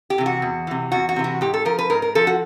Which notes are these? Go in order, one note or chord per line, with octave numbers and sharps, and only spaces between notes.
G4
C3 E3
F#4
E2
C3 E3
E2 F#4
F#4
C3 E3
F#4
G#2 G4
A4
F3 A#4
B4
G#2 A#4
A#4
F3 A4
F#4